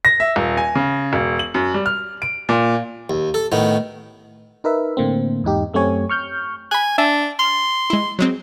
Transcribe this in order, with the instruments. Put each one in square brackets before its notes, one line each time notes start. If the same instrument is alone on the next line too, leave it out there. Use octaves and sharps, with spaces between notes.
[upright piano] A#6
E5
D#1
G#5
C#3
E1
F#7
F#2
G3
F6
D7
A#2
[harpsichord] D#2
A4
A2 D#3 B3
[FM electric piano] D#4 A#4 B4 E5
A2 D3 A#3 C4
E2 G#2 D#4 G4
F#2 A3 C4 G4 C#5 G#5
C#6 F6 G6
[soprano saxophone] G#5 [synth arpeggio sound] B5 F#6
[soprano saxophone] D4 [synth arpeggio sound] E5 G#5
[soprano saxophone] C6 [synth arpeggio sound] F6
[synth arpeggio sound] G#3 E4
F#3 G#3 C4